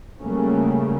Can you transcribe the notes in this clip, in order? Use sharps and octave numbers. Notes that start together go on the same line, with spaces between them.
C#3 F#3 G3 A3 A#3 C#4